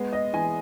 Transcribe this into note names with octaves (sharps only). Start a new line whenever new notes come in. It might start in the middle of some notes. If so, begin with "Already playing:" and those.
Already playing: G#3 B3
D#5
E3 G#5